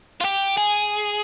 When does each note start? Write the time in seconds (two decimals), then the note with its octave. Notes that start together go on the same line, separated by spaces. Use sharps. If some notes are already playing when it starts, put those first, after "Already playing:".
0.20 F4
0.24 G4
0.57 G#4